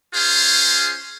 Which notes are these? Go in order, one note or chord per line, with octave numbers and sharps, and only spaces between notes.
C#4 F4 G#4 C5